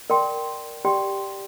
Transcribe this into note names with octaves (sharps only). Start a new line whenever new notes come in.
A#4 D5 G5 C6
G4 D5 G5 C6